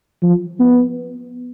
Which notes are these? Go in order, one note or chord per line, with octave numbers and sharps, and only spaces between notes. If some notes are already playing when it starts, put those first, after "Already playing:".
F3
B3